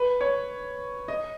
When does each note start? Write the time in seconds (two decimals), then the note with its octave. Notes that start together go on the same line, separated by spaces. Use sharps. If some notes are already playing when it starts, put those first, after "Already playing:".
Already playing: B4
0.21 C#5
1.08 D#5